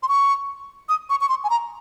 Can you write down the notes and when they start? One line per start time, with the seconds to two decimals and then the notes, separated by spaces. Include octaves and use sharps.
0.03 C6
0.09 C#6
0.89 D#6
1.10 C#6
1.21 C#6
1.29 C6
1.44 G#5
1.50 A#5